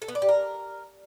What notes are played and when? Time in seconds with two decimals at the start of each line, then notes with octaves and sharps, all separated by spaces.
0.02 A4
0.08 B3
0.15 D5
0.22 G4
0.29 A#4